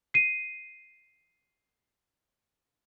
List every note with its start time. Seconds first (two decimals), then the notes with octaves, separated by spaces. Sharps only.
0.14 C7 D#7